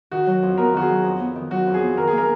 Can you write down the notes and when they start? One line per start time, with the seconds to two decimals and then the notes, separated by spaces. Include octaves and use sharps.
0.11 D#3 F#4
0.27 F#3
0.42 F2
0.58 B3 A#4
0.74 D#3 F#4
0.82 G#4
0.89 F#3
1.04 F2
1.20 B3
1.35 D#3
1.51 F#3 F#4
1.67 F2
1.74 G#4
1.82 B3
1.97 D#3 A#4
2.07 G#4
2.13 A#3 A#4